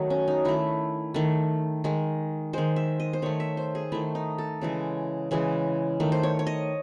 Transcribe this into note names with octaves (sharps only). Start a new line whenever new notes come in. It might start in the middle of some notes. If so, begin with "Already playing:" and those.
Already playing: D#3 F#3 A3 D#4 F#4
C#4
D#4
D#3 A3 E4
D#3 A3
D#3 G#3
D#3 G#3 C5
E5
D#5
C5
D#3 A3 C#5
E5
C5
G#4
D#3 A3 E4
D#4
A4
C#3 E3 G#3
C#3 E3 G#3
D#3 A3
C5
C#5
C#5
D#5